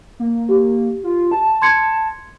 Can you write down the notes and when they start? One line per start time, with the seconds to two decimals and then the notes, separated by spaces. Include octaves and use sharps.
0.20 A#3
0.49 G4
1.04 F4
1.32 A5
1.62 C6 G#6 C#7